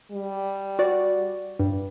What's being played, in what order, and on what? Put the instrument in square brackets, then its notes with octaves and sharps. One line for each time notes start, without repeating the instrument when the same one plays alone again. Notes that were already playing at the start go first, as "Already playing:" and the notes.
[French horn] G3
[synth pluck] F#4 D5
G2